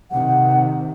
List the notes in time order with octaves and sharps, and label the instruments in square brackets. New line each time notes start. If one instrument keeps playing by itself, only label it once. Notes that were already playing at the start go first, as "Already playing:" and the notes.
[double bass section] C3 D#3 [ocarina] F#5